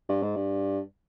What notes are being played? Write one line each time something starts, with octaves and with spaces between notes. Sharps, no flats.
G2
G#2
G2